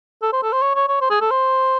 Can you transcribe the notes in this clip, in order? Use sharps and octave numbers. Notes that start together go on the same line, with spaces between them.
A4
C5
A4
C5
C#5
C#5
C#5
C5
G#4
A4
C5